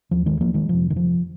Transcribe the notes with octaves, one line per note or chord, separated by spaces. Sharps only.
D#2 F3
D#3 G#3
F3 A#3
D#3 G#3
F2 C3 F3
D#3
F3